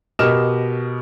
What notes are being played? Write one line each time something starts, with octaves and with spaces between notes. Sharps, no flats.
B2 G4 A#4 D#5 F6 E7